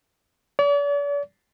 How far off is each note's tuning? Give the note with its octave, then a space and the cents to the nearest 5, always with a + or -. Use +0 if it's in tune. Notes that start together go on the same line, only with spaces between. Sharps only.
D5 -45